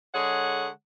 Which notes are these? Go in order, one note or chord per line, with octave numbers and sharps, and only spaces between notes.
D3 G#3 G#4 C#5 F#5